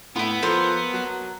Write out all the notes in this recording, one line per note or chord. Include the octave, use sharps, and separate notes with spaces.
A2 B3 E4 F4
F3 A4 A#4 C6
F#3